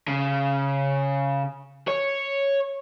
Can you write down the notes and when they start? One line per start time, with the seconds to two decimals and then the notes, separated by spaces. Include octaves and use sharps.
0.08 C#3
1.88 C#5